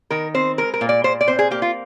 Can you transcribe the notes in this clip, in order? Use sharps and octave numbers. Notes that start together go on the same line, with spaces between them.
D#3 A#4
C4 C5
G#3 A#4
A#4
A#2
D5
A#2 C5
D5
C4 C5
G#4
A#3 G4
F4